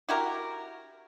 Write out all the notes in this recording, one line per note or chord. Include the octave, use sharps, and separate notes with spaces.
E4 F#4 G4 A#4